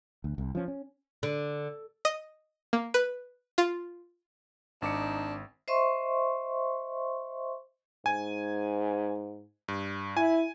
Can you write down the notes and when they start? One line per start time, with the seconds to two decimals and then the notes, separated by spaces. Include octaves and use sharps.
0.24 D2
0.38 C2
0.55 F3 C#4
0.68 C#4
1.23 D3
2.05 D#5
2.73 A#3
2.94 B4
3.58 F4
4.82 G#1 D4 D#4 D6 C#7
5.68 C5 D#5 E5 C6 C#6
8.06 G#2 G#5
9.68 G2
10.17 E4 G#5